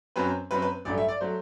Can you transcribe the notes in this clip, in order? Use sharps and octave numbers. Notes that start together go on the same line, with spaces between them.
F#2 F#3 C4 B4
F#2 F#3 C4 B4
B4
A1 G2 F#3 A3 D5
E5
D5
F#3 A3 C5